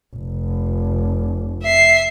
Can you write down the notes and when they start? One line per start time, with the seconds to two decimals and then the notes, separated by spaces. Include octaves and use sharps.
0.17 F1
1.62 E5 C7